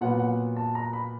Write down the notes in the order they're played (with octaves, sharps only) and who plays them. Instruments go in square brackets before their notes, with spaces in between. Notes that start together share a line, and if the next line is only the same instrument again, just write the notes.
[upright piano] A#2 F#3 B3 F#5
F#5
A5
A#5
B5